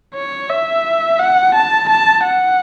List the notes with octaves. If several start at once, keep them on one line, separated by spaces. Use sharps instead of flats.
C#5
E5
F#5
A5
A5
F#5